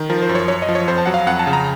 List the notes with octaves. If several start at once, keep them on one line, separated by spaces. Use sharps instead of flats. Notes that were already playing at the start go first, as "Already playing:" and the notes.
Already playing: D#3
F3 A#4
C5
F#2
C#5
F#2 C#5
D#5
F3
C#5
F2 C5
A5
F#3 F#5
F5
F2 F#5
A5
C#3
A#5